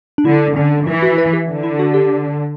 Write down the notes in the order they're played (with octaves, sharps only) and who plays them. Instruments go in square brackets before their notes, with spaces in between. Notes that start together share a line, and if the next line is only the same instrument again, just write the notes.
[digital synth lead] D4
[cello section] D3 [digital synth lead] E4
[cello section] D3 [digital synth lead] C#4
[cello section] E3 [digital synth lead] E4
[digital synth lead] F#4
B4
G4
[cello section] D3
[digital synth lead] E4
F#4
G4